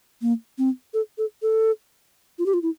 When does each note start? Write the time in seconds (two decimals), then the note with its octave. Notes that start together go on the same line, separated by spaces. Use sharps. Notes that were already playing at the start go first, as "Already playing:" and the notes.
0.22 A#3
0.58 C4
0.94 A4
1.18 A4
1.42 A4
2.39 F4
2.46 G4
2.54 F4
2.62 E4